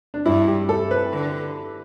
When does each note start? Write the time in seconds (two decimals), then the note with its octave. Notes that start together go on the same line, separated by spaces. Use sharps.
0.14 D4
0.26 G2 E4
0.47 G4
0.69 A4
0.91 B4
1.13 D3